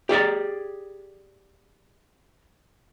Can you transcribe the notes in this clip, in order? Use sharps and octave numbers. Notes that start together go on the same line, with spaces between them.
G4 G#4 D5 A#5